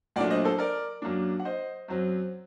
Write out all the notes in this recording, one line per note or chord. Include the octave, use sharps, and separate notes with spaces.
A#2 F#3 A3 D4 D5 F#5
C5 D#5
A4 C5
A#4 D5
F#2 F#3 A#3 D4
F#5
C5 D#5
F#2 F#3 C4